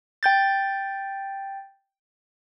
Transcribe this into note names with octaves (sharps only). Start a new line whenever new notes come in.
G5 G6 A6